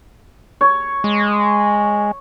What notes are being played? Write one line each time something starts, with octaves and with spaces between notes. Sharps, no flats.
C#5
G#3